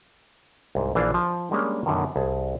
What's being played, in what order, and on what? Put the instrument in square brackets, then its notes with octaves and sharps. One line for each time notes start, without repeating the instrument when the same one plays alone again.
[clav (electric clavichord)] C2 G#2
A#1 E3 A#3 D4 F5 A5
F3
G3 G#3 A#3 C#4 D4
F#2 B2 D3 D#3
C2 G#4 A5